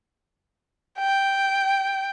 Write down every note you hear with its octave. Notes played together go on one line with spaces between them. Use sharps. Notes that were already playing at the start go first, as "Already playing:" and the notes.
G5